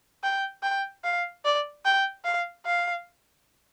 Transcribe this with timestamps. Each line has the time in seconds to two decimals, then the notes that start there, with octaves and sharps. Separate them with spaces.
0.23 G5
0.63 G5
1.04 F5
1.45 D5
1.85 G5
2.25 F5
2.65 F5